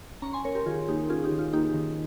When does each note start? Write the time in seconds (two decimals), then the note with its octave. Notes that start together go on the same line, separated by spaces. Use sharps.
0.22 C#4 A#5 C#6
0.33 G#5 C6
0.45 C#4 A#4 C#5
0.55 G4 A#4
0.66 D#3 F4 G#4
0.88 A#3 D#4 G4
1.10 C#4 F4 G#4
1.24 D#4 G4
1.32 D#3
1.39 F4
1.53 A#3 D#4 G4
1.74 D#3